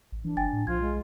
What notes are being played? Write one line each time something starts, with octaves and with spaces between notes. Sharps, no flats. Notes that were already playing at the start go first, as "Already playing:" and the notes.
A1
E3 D4
G1 G5 G#5 A6
A2
B1 F3 F4 G#6
G#3